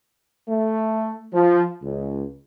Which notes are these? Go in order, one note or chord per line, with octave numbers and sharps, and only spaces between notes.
A3
F3
C#2